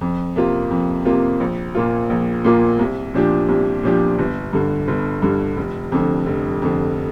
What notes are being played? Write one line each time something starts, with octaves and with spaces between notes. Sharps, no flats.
F2
C3 A#3 F4
F2
C3 A#3 F4
A#1
A#2 A#3 F4
A#1
A#2 A#3 F4
C2
A#2 F3 D4 G4
C2
A#2 F3 D4 G4
G1
G2 D3
G1
G2 D3
F1
F2 D3
F1
F2 D3